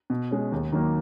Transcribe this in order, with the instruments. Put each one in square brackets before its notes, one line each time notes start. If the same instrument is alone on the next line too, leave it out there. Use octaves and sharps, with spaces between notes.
[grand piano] B2
G#3 C#4
D#2
D#3 F#3 A#3